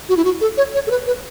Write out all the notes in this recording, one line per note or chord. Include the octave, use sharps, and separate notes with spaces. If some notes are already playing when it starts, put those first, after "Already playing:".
F#4
E4
F#4
A4
C#5
C#5
A4
B4
B4